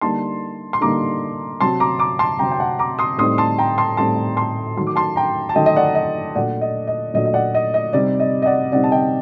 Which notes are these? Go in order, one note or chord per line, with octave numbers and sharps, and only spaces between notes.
D3 G3 A#3 D#4 A5 C6
C6
D3 G3 A#3 D#4 A#5 D6
C3 F#3 C4 A5 C6
A#5 D6
A#5 D6
A5 C6
C3 F#3 C4 G5 A#5
G5
F#5 A5
A#5 D6
C6 D#6
A2 G3 C4 D#4 C6 D#6
A5 C6
G5 A#5
A5 C6
A2 G3 C4 D#4 A5 C6
A5 C6
D#3 F#3 A3 C6
D6
A5 C6
G5 A#5
A5
D#3 F#3 A3 D#5 G5
D#5
D5 F#5
D#5
A#2 F#3 A3 D4 D5 F#5
D#5
D#5
A#2 F#3 A3 D4 D#5
D#5
D5 F#5
D#5
D#5
C3 G3 C4 D#4 D5
D#5
D#5
D5 F#5
C3 G3 C4 D#4 D5 F#5
A5
D#5 G5